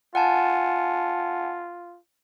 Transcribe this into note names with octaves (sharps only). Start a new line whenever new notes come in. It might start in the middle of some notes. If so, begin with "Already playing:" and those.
F4 F#5 G#5 A5